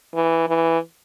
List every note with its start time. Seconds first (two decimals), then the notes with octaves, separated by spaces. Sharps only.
0.15 E3
0.48 E3